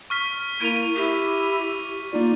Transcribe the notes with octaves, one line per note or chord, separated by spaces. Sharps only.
C#6 F6 B6
A#3 E4 D#7 F7
E4 G4
A#3 D#4 F4 D5